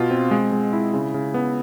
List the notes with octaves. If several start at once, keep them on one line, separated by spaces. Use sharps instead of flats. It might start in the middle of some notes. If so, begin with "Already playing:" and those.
Already playing: B2 F4
C4
G#3
G#3
E4
C#3
C#3
B3